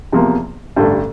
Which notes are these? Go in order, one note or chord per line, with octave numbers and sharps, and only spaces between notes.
E2 C3 F3 A#3
A1 G2 D3 A3